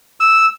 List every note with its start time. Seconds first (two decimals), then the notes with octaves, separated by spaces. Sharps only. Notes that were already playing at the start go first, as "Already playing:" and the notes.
0.20 E6